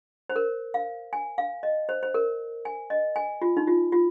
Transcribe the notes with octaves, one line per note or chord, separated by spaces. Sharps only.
C5
A#4
F5
G#5
F5
D#5
C5
C5
A#4
G#5
D#5
G#5
F4
D#4
F4
F4